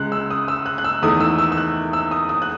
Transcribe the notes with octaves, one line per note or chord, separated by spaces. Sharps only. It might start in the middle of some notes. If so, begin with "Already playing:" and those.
Already playing: C#2 C#3 G#3 F#6
E6
D#6
E6
F#6
F#6
E6
E2 D#3 A3 D#6
E6
E6
E6
F#6
E6
D#6
D#6
F#6